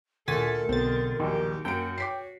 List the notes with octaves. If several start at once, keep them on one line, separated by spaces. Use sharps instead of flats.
D2 A#2 A3 A4 A#4 G#5 A6 B6
B1 B2 D3 C4 G#4 A6
A#1 D#2 D#3 F#3 G4
F#2 A#3 F#4 G5 D7
C#5 D6 B6 C7